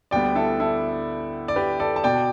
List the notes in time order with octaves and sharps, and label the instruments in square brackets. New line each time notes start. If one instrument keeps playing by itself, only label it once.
[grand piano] D2 D3 G3 B3 D5 G5
E4 A4
E4 A4
D5
G4 B4
A4 D5
A5
B2 B3 D5 G5